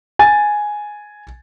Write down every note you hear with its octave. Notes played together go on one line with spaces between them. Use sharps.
G#5 A6